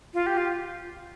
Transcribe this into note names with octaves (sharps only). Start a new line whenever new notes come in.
F4
G4
F4